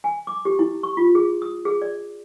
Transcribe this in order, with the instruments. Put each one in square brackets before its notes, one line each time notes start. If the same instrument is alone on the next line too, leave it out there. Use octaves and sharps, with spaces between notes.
[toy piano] G#5
D6
G4
E4
C#6
F4
G#4
D#6
G#4
D5